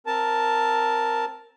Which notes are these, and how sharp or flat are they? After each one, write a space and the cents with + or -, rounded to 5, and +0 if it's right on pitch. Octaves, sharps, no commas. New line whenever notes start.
C4 +5 A#4 +0 A5 +0